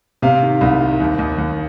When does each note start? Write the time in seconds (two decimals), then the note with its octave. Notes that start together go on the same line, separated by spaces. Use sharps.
0.22 C3 F5
0.42 D#3
0.61 C2
0.81 D#3
1.00 D#2
1.19 D#2
1.38 D#2